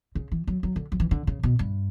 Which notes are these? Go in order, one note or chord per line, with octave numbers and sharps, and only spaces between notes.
C#3
E3
F#3
F#3
D3
F#3
E3
D3
C#3
B2
G2